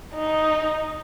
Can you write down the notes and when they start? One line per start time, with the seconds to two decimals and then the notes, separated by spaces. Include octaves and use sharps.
0.15 D#4